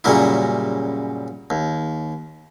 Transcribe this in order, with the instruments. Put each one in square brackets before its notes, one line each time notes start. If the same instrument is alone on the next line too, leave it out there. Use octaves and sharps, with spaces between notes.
[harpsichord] F#2 A#2 C#3 G3 A#3 E4
D#2